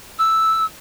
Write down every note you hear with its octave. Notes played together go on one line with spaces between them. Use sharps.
E6